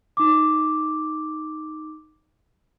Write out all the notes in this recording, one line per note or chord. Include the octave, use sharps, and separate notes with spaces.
D#4 D6